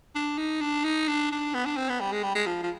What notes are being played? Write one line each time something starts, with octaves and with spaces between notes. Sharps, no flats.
D4
D#4
D4
D#4
D4
D4
B3
D4
C4
B3
G3
G#3
G3
G#3
F3
F3